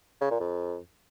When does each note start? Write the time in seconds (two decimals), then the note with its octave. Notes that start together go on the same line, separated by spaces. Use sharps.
0.21 C#3
0.31 A#2
0.40 F2